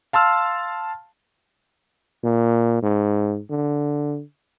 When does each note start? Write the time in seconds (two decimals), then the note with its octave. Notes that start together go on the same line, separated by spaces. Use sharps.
0.13 F5 A5 C6 E6 F6
2.24 A#2
2.82 G#2
3.50 D3